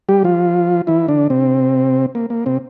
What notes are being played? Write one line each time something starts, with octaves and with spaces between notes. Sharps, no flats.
G3 G4
F3 F4
E3 E4
D3 D4
C3 C4
A#3
A#3
C3 C4